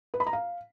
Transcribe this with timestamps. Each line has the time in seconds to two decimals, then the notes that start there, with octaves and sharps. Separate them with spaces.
0.14 B4
0.20 B5
0.27 A#5
0.33 F5